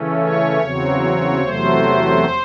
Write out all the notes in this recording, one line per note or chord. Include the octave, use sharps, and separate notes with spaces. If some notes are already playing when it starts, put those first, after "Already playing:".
Already playing: C#3 E3 A3 C#4
C#5
E2 C#3 F#3 C4
E2 C3 F#3 A3 C5